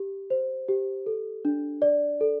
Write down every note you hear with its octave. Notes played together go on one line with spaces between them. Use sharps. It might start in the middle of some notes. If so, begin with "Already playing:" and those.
Already playing: G4
C5
G4
A4
D4
D5
A4